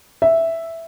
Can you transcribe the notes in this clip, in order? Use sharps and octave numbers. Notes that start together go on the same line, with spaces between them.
E5